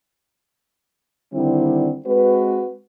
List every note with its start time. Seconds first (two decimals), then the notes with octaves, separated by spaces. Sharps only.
1.33 D3 D#3 G3 C4 E4
2.05 G#3 C4 F#4 B4